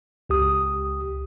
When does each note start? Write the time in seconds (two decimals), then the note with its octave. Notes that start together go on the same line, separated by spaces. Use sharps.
0.29 C#2 G4 D#6